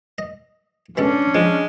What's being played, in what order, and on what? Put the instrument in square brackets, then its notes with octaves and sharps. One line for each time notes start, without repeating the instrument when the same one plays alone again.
[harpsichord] D#5
[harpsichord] B2 G#3 A4 [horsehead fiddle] C#4 D4
[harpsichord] F3 [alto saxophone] G#3